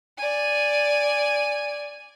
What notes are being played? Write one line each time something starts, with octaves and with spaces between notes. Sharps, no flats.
D5 G#5